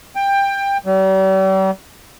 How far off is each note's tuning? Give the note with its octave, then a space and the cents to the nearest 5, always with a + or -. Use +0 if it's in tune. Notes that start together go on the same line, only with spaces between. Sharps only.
G5 +20
G3 -40